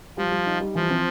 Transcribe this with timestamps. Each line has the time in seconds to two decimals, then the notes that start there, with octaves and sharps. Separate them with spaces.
0.17 F3 G3
0.32 G3
0.46 D#4
0.61 G3
0.75 E3 F3
0.90 C4